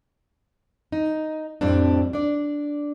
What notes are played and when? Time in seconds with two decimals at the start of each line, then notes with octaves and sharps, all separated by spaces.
0.92 D#4
1.61 F2 A2 G3 C4 D4
2.13 D4 D5